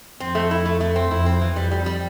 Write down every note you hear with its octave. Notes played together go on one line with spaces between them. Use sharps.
F2 C4
A3
E4
A3
A3
C4
F2 E4
C4
E3
F2 G3
G3
G3